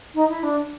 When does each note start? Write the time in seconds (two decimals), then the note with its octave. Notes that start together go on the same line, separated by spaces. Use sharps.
0.15 D#4
0.29 E4
0.43 D4